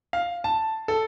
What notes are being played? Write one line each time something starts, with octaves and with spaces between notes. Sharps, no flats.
F5
A5
A4